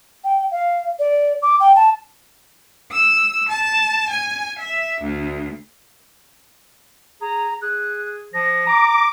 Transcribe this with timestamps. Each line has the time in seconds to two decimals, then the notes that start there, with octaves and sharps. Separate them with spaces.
0.24 G5
0.51 F5
0.99 D5
1.42 D6
1.60 G5
1.75 A5
2.92 E6
3.48 A5
4.08 G#5
4.57 E5
5.01 D2
7.21 G#4 A#5
7.62 G#4 F#6
8.34 F3 A#6
8.67 A#5 D6